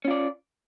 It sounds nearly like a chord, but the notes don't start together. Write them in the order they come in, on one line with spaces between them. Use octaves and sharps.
C#4 F4 D5